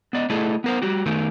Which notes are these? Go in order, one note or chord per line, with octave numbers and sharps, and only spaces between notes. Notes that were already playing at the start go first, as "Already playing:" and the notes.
B3 D5 D#5
A3 E4 G#4 A4 D5 D#5
B3 A#4 C5
G3 F#4 G4
D#3 A3 D#4 A#4